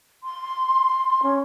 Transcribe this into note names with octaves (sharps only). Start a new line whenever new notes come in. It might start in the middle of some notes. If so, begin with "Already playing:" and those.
C6
C#4